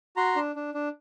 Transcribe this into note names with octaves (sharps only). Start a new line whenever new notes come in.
F#4 A#5 C6
D4
D4
D4